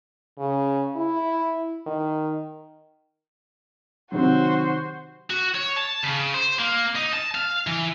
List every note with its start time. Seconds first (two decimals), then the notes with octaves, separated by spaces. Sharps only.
0.38 C#3
0.96 E4
1.86 D#3
4.12 C3 D#3 F#3 F#4 C5
5.30 F#4
5.55 C#5
5.76 A5
6.04 C#3
6.34 C5
6.59 A#3
6.96 D#4
7.13 A5
7.35 F5
7.67 E3